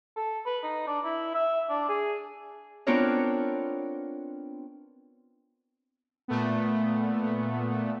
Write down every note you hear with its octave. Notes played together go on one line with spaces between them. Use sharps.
A4
B4
D#4
D4
E4
E5
D4
G#4
B3 C4 D4 F4 A#4 C#5
A#2 A3 B3